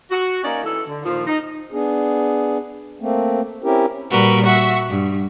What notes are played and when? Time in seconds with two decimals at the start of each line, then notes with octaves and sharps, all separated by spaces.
0.11 F#4
0.44 A#3 C#4 D#4 D5
0.64 E3 A4
0.88 D3
1.04 A#2 D#3 F3
1.27 D#4
1.72 B3 D4 G#4
3.00 A3 A#3 C4
3.63 C4 C#4 E4 G4 A#4
4.11 A#2 G3 F#4 A#4 B4
4.44 F#4 E5 F#5
4.87 G2